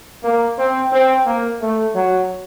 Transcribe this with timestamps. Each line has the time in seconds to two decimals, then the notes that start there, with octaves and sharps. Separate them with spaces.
0.23 A#3
0.57 C4
0.92 C4
1.26 A#3
1.61 A3
1.96 F#3